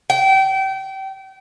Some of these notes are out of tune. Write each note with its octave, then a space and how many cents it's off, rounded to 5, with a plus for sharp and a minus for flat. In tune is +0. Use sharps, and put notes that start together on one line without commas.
G5 -30